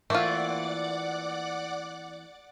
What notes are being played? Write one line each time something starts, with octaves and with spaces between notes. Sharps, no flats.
E3 A3 A#3 C4 F4 D5 F#5 D6